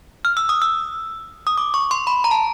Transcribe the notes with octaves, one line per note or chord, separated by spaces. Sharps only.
F6
E6
D#6
E6
D#6
D6
C#6
C6
B5
A#5
A5